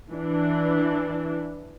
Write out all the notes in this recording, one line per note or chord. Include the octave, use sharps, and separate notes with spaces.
E3 D4